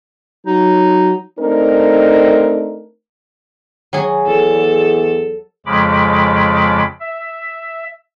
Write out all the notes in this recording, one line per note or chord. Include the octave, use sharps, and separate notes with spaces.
F#3 D#4
A3 C4 D4 D#4 A#4
F#3 G#4
E2 A4
F2 C#3 F3 G#3 B5 D6
E5